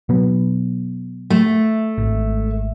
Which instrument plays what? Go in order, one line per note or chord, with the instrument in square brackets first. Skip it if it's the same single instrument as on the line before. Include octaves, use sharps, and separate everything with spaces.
[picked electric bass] B2 F#3 B3
[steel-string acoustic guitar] A3
[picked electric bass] G#1